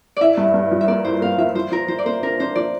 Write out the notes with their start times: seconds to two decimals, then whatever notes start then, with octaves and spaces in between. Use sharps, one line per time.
0.17 E4 D5 E5
0.38 G2
0.54 G2
0.72 F3
0.81 E5
0.88 A#3 D5
1.05 E4 C5
1.21 A#3 F5
1.38 F3 E5
1.55 F3 C5
1.72 F3 A#4
1.88 F3 C5
1.99 D5
2.05 A#3 C5
2.23 D4 A#4
2.40 D4 C5
2.55 F3 D5